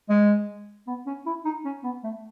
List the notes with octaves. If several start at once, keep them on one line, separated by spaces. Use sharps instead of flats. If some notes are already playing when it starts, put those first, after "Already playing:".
G#3
B3
C#4
E4
D#4
C#4
B3
A3